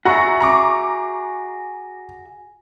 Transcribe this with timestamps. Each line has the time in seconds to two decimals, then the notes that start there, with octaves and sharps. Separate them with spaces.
0.05 F#4 G#4 E5 F#5 A#5 C#6
0.40 A#5 C#6 D6